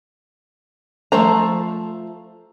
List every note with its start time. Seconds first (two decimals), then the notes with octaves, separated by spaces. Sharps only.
1.12 F3 A3 C5 A#5